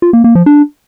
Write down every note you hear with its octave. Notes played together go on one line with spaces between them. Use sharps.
F4
A#3
A#3
F3
D4